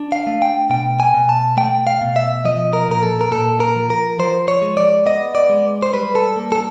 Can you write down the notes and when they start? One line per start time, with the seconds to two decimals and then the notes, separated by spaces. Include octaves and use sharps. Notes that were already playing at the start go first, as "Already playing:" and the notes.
Already playing: D4
0.12 F5
0.27 A3
0.42 G5
0.70 B2 G5
1.00 G#5
1.14 B2
1.29 A5
1.57 A3 G5
1.87 F5
2.01 B2
2.16 E5
2.45 F3 D#5
2.73 A#4
2.89 A#2 A#4
3.03 A4
3.21 A#4
3.31 A#2 A4
3.60 A#4
3.76 F3
3.90 A#4
4.19 F3 C5
4.48 C#5
4.62 G#3
4.77 D5
5.06 B3 D#5
5.35 D5
5.49 G#3
5.83 C5
5.93 G3 B4
6.15 A4
6.36 A#3
6.52 A4